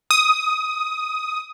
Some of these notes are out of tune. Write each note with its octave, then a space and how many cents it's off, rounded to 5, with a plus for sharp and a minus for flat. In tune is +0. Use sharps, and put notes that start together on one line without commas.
D#6 +15